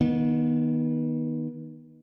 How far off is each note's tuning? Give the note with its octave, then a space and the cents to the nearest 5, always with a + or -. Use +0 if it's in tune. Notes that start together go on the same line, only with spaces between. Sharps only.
D#3 +0 B3 -35